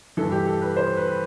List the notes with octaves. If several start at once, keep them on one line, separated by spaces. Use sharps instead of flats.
G2 E3 A4
G4
A4
B4
C5
B4